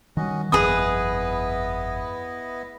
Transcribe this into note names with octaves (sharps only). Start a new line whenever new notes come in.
D#3 E3 G3 C#4 F#4 D#5
G1 F2 B3 E4 G#4 B4 D#5 D#6